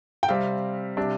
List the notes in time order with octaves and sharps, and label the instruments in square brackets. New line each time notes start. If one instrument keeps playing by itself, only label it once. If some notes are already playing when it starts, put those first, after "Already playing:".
[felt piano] G5
[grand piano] C3 G3 C4 [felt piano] F5
[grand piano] C3 G3 D4